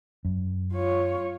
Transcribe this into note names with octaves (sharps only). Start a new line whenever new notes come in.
F#2
F4 C#5